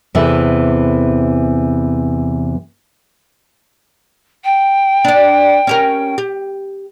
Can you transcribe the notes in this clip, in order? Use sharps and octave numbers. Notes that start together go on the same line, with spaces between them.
E2 C3 E3 A4 E5
G5
D4 D5
C#4 G4 A#4
G4